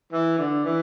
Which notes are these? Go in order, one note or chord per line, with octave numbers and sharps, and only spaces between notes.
E3
D3
E3